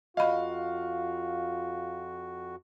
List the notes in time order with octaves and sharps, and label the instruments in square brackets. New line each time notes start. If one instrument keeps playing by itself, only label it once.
[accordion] F2 F#4 [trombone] F4 [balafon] D#5 B5 [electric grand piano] F5